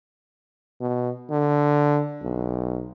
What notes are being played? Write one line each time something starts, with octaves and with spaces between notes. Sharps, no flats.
B2
D3
B1